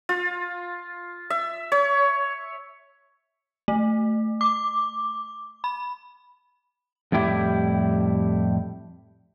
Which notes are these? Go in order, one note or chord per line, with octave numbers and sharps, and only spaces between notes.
F4
E5
C#5
A3
D6
B5
F2 A2 G3 E4 G4 E5